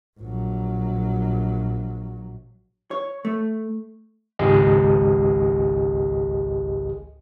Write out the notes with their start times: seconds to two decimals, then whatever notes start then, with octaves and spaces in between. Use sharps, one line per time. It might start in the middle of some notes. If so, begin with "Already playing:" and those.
0.19 A#1 F#3
2.91 C#5
3.25 A3
4.39 G#1 C#2 G4 G#4 D#5